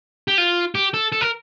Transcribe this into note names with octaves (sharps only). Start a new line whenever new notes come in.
G4
F4
G4
A4
A4
A#4